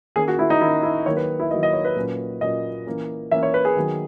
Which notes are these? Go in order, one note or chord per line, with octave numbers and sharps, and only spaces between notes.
D#3 A#3 C#4 G#4
F#4
E4
D#4
D#3 A#3 C#4 E4
E4
D#3 F#3 A#3 C#5
B4
E4
D#3 F#3 A#3 D#5
D#5
C#5
B4
A#2 F#3 A#3 C#4
A#2 F#3 A#3 C#4 D#5
E3 A#3 C#4
E3 A#3 C#4 E5
C#5
B4
G#4
D#3 F#3 B3